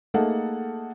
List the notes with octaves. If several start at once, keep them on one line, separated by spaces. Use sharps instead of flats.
A3 A#3 D#4 G#4 A4 F#5